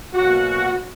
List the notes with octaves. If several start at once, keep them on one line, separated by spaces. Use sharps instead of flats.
B2 F#3 A#3 C#4 F#4